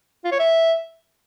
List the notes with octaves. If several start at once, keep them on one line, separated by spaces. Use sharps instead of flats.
F4
C#5
E5